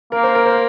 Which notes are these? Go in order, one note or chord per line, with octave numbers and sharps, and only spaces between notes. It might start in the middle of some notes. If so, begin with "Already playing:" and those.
A#3 A#4
C5
A#4
C5